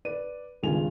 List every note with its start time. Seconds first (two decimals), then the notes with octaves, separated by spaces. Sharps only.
0.05 B4 D5 D#7
0.63 G#1 C#2 G2 F4 G#5 F7